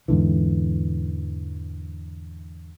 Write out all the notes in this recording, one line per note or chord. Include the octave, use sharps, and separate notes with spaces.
E2 G#2 D3 E3